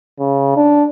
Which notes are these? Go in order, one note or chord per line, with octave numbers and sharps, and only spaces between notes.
C#3
D4